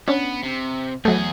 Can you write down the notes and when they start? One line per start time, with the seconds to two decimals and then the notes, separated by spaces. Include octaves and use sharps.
0.08 B3 C#4 D4
0.43 C3
1.05 E2 F#3 A3 G#4